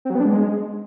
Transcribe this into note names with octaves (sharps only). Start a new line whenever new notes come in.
C4
F#3
B3
D4
G#3